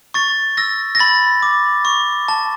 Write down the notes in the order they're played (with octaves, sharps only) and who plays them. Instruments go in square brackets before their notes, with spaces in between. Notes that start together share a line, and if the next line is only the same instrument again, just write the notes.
[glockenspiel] C#6 A6
E6 A#6
A#6
B5 A6
D6
C#6
A5